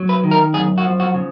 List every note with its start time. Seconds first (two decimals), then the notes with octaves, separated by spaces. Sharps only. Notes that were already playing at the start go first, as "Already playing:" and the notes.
Already playing: F#3
0.09 B4
0.24 D#3
0.31 A#4
0.54 F#2 G#4
0.78 F#4
0.84 F3
1.00 F#4
1.14 C#3